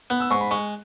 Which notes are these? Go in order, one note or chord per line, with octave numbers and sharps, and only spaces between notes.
B3 F#6
E6
G#2 C#6
B5
G#3 C#6